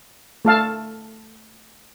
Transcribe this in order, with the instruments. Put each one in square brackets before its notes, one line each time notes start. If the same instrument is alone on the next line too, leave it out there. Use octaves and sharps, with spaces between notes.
[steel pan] A3 A4 F5 A5